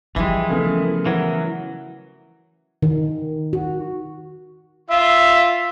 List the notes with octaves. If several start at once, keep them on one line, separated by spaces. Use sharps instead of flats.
E3 F3 G3 G#3 G4 E5
C#3 A3 B3 A#4
E3 F#3
D#3
F#4
F4 E5